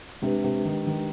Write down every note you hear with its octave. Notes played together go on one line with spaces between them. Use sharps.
C3 G#3 D4 G4 B4
C3
D#3
D#3